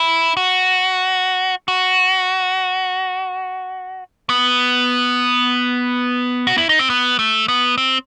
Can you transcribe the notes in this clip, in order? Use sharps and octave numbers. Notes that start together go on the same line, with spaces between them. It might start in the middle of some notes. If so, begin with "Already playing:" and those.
Already playing: E4
F#4
F#4
B3
F#4
E4
D#4
C4
B3
A3
B3
C4